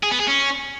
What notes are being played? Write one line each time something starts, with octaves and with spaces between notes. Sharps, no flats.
G#4
B3
G#4
C#4